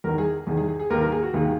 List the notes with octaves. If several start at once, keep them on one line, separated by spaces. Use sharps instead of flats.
E2 D#3 A#4
G#4
E2 D#3 G#4
G#4
G#4
G#4
D#2 D#3 A#4
A#4
G#4
F#4
D#2 D#3 G#4